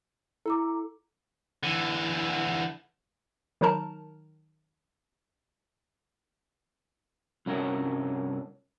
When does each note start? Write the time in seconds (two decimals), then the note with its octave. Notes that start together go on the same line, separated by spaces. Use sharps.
0.46 E4 A4 A#5 D6
1.63 D3 E3
3.61 D#3 F#3 D#4 A#4 A5 A#5
7.46 C2 G2 C#4 F#4 A#4 C#5